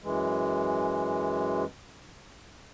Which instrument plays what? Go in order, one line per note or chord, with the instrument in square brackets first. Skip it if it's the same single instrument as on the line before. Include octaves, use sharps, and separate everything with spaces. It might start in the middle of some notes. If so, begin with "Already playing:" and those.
[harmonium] F#2 E3 G#3